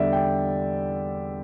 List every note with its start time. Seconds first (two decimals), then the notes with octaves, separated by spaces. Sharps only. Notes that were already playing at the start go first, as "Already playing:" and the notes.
Already playing: E2 D3 G3 D5 E5
0.13 G5